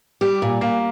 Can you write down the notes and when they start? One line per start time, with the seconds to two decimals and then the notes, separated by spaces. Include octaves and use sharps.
0.21 G3 G4
0.42 A#2
0.61 A#2 A#3